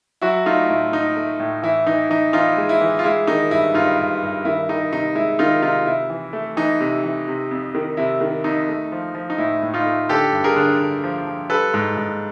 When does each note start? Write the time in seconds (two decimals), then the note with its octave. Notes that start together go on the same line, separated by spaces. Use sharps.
0.21 F#3 E4 F#4
0.46 A3 D#4 F4
0.69 A2 E4
0.92 A3 D#4
1.17 A3
1.40 A2
1.63 E3 E4
1.86 E3 D#4
2.10 E3 D#4
2.33 E3 D#4 F4
2.57 G#3
2.69 E4
2.81 E3
2.99 F4
3.04 G#3 E4
3.27 D#3 D#4
3.51 G2 E4
3.74 G2 D#4 F4
3.99 G2
4.22 G2
4.45 D#3 E4
4.69 D#3 D#4
4.92 C3 D#4
5.15 G#3 E4
5.39 D#3 D#4 F4
5.62 C3 D#4 F4
5.86 C3 E4
6.10 E3
6.33 A3
6.57 E3 D#4
6.80 C3
7.04 E3
7.28 C3
7.51 F2
7.75 D#3
7.97 C3 E4
8.21 D#3
8.44 F2 D#4
8.69 A3
8.92 F3
9.15 F3
9.30 D#4
9.38 A2 E4
9.62 A2
9.74 D#4 F4
9.86 A3
10.09 D3 G4 A4
10.33 G2
10.44 G#4 A#4
10.56 D3
10.80 D3
11.03 F3
11.27 F3
11.50 G3 A4 B4
11.74 G#2
11.97 G#2